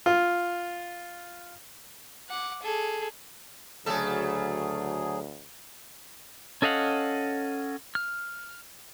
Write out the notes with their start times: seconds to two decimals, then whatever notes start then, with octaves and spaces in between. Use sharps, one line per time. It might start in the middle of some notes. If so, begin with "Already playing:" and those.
0.06 F4
2.29 F#5 D6
2.63 G#4 A4
3.86 D2 C#3 F#3 A3 G#4 A4
6.62 C#4 A4 D#5 F5 F#5
7.95 F6